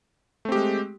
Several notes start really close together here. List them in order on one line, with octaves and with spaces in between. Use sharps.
A3 C4 G4 G#3